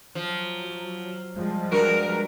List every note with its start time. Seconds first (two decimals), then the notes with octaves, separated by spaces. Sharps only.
0.15 F3 F#3
1.36 F3 G3 G#3
1.72 G2 F#4 A#4